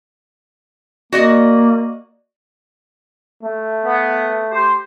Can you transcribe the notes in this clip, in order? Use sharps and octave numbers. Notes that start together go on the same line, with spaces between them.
A#3 F#4 D5 D#5
A3
B3
G4 C5